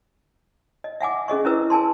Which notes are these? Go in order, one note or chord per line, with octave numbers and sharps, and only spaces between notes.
D#5
E5 F#5 G#5 D6
C#4 G#4 D#5 C#6
C#4 E4 A#4 B4 E6
A#4 G#5 A5 C6